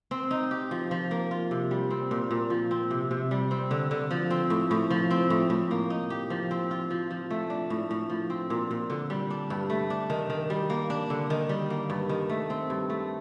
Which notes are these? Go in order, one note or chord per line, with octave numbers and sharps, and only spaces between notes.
C4
D#4
G4
F3
F3
A#3
F4
C3
G3
C4
A#2
A#2
F3
C4
C3
C3
G3
C4
D3
D3
F3
C4
A2
A2
F3
C4
A2
A2
A#3
D#4
G4
F3
C4
F4
F3
F3
A3
D4
A2
A2
F3
C4
A#2
A#2
D3
G3
D4
G2
A3
D4
D#3
D#3
G3
A#3
D4
D3
D#3
G3
A#3
G2
D#3
A3
C4
G2
A3